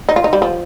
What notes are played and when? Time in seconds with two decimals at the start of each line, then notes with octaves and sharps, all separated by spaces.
0.09 D#4
0.16 F4
0.24 D#4
0.33 G3
0.42 F3